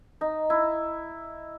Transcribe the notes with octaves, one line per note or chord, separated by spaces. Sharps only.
D#4
E4